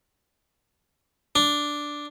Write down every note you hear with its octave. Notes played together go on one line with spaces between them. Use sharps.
D4